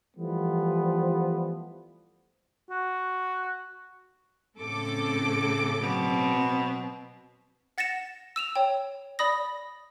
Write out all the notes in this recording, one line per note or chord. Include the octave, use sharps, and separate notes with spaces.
E3 F3 G3 A3 B3
F#4
A2 C#3 C4 A4 D6
B2 F#3 C4
F#5 A6 A#6 C#7 E7
E6 E7 F7
C#5 G5
D5 B5 D#6 A#6